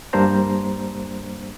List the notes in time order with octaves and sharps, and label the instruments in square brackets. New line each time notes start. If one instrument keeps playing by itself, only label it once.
[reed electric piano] G2 G3 A#3 D4 C5 A#5